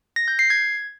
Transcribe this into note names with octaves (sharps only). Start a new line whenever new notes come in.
A#6
G6
C7
G#6